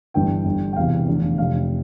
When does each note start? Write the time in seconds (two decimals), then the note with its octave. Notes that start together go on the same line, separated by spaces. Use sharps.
0.14 G1 G2 E3 G5
0.45 G1 G2 D3
0.73 G5
0.76 E1 E2 C3 E3 F5
1.07 F1 E2 D3
1.38 F1 F2 C3 F5